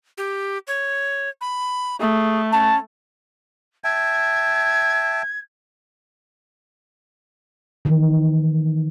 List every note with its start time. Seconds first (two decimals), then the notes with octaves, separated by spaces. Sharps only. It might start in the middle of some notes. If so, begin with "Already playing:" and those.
0.17 G4
0.67 C#5
1.41 B5
2.00 A3 G#4
2.52 C#4 A5
3.84 E5 G5 A5 G#6
7.85 D#3 E3